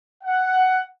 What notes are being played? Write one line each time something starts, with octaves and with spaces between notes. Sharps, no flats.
F#5